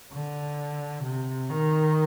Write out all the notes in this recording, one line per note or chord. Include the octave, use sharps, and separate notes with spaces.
D3
C3
D#3